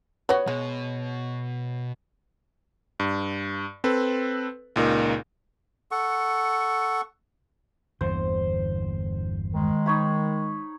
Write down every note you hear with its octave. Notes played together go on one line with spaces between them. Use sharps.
B3 F#4 C#5
B2 G#3
G2
C4 A4 B4
C#2 A#2 D#4 A#4
A4 F#5 C#6
G1 E2 D3 C5
D#3 G#3
D#4 C#5 B5